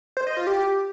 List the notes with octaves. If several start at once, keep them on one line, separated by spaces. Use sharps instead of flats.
C5
D#5
F4
G4